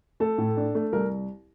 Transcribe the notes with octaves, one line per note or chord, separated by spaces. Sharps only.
A3 A4
A2
D4
A3
C2 A#4